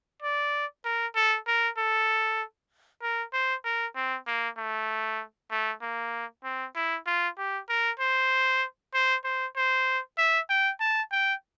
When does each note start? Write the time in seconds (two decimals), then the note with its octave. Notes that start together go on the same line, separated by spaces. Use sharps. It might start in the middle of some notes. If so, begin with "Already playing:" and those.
0.22 D5
0.85 A#4
1.15 A4
1.47 A#4
1.78 A4
3.02 A#4
3.33 C5
3.65 A#4
3.95 C4
4.27 A#3
4.57 A3
5.51 A3
5.82 A#3
6.44 C4
6.76 E4
7.06 F4
7.38 G4
7.69 A#4
7.99 C5
8.94 C5
9.24 C5
9.56 C5
10.18 E5
10.50 G5
10.80 A5
11.12 G5